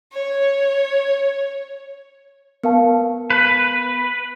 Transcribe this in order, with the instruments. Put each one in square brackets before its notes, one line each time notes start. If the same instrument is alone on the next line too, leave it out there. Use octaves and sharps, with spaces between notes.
[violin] C#5
[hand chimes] B3 [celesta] A#4 F5 A5
[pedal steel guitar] B4